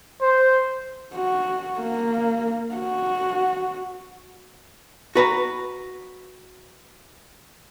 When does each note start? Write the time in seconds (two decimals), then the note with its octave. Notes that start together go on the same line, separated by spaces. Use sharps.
0.21 C5
1.15 F#4
1.80 A#3
2.75 F#4
5.15 F#4 B4 A#5